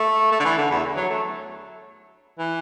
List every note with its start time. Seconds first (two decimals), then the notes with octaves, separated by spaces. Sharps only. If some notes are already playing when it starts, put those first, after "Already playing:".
Already playing: A3
0.32 A3
0.40 D3
0.44 E3
0.58 D3
0.70 E2
0.97 F#3
1.10 A3
2.39 E3